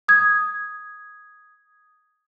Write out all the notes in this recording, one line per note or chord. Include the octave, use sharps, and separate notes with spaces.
D#6 G#6